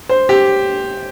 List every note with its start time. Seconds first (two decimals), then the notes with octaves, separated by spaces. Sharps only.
0.09 C5
0.29 G4